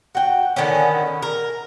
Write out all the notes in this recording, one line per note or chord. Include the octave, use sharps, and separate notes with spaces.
F#4 G5
D3 D#3 B3 C#4
A#4